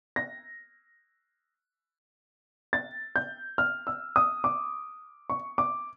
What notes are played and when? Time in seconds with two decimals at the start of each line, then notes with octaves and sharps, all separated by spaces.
0.16 A#6
2.73 A6
3.16 G6
3.58 F6
3.87 E6
4.16 D#6
4.44 D6
5.30 C#6
5.58 D6